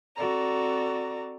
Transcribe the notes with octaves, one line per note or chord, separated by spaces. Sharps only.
C4 F#4 A4 D5 A#5